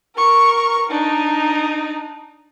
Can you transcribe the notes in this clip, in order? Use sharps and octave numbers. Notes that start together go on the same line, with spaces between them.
A#4 C#6
D4 D#4